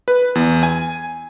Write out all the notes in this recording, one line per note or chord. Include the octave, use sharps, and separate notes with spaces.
B4
E2
G#5